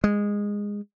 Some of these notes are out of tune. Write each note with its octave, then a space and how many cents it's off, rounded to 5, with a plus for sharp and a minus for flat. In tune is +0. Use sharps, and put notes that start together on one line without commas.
G#3 -15